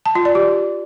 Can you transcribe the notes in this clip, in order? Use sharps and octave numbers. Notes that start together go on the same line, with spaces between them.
A5
F4
D5
G4